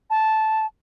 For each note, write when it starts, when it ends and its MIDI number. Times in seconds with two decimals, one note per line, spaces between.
0.10 0.66 81